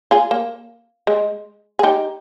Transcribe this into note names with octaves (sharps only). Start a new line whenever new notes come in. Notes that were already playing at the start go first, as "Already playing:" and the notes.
F4 G#4
A#3
G#3
G#4
D#4 G4